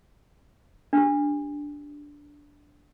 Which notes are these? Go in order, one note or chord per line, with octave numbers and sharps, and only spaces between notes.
D4 G4